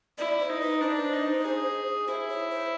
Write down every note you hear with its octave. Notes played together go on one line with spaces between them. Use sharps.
E4 D5
C5
D#4
B4
D4 C5
D#4
G#4
E4 C5
C#5
C5